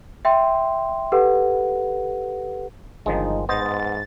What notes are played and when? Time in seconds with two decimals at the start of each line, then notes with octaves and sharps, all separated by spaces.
0.25 E5 G5 C6
1.12 G4 A4 B4 F#5
3.06 G1 D#3 F3 G#3 D#4
3.49 G#2 B3 C5 D#5 A6